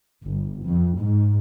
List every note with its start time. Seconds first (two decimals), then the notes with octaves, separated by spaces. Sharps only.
0.25 G1
0.65 F2
0.99 G#2